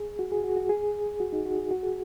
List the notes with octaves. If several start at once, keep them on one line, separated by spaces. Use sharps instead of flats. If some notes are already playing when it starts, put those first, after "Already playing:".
Already playing: G#4
F#4
G#4
F#4
F#4
G#4
F#4
D#4
F#4
G#4
F#4
G#4